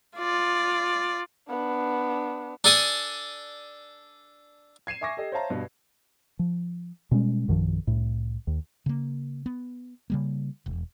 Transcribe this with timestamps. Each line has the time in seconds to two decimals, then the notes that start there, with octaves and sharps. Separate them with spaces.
0.17 F4 D5
1.50 B3 D4
2.64 D4 A4 G#5 D#6
4.87 G#6 C7 D#7 E7
5.01 E5 G#5 C#6 D6 A#6
5.17 G4 A4 D#5
5.32 C5 C#5 E5 F5 A5 A#5
5.50 G2 B2
6.39 F3
7.11 B2 G3 G#3 C#4
7.48 A#1 F#2 D#3 F3
7.87 C2 A2
8.47 D#2
8.86 C#3 A#3
9.46 B3
10.10 C#3 G3 A#3
10.66 E1